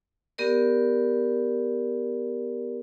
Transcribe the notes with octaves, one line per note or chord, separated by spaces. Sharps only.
B3 G4 A#4 D5